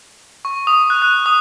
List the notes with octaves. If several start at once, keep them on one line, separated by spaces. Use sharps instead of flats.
C#6
D#6
F#6
F#6
D#6